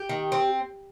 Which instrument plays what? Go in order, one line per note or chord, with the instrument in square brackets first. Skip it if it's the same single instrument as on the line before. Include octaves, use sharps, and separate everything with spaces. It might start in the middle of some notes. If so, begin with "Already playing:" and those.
Already playing: [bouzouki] G4
D#3
C4